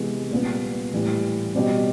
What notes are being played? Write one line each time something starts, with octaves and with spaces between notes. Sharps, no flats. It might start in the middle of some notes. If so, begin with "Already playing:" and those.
Already playing: C3 E3 G#3 B3
A#2 G3 B3
A2 E3 G3
B2 G3 C4